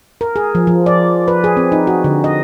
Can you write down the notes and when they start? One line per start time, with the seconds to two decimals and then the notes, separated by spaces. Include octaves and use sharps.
0.21 A#4
0.36 G#4
0.55 F3
0.67 F3
0.86 D5
1.28 B4
1.44 G#4
1.57 C4
1.72 D#4
1.87 F#4
2.04 D3
2.24 D#5